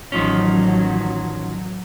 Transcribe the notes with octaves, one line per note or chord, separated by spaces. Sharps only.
A1 D#3 F3 F#3 C#4